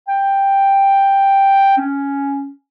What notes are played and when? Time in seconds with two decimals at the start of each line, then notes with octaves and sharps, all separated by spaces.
0.08 G5
1.77 C#4